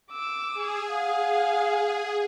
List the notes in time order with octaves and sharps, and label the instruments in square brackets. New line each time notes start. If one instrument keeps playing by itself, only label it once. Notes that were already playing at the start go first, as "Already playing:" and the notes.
[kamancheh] D6 E6
[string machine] G#4
[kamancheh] F5 F#5